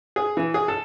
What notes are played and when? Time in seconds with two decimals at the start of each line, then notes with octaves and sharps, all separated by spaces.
0.16 G#4
0.37 E3
0.54 G#4
0.68 A4